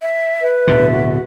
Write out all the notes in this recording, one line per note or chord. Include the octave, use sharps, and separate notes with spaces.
E5
B4
D1 B2 D3 E5
F#4